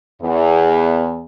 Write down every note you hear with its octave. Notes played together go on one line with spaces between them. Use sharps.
E2